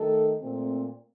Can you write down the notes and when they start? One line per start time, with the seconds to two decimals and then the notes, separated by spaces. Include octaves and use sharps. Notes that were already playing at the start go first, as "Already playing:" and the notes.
Already playing: D#3 A3 D#4 A4
0.41 A#2 A3 C4